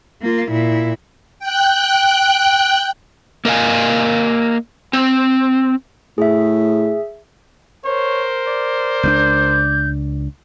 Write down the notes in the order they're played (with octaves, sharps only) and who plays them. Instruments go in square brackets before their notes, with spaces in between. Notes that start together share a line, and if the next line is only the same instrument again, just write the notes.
[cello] A#3 F4
A#2 E4
[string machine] G5 F#6
[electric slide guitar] A#3 A#4 D#5 F5 G#5
C4
[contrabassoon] A2 [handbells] G#4 E5
[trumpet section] A#4 C5 [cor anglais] C#5
[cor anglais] D5
[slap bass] C#2 A3 D4 [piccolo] G6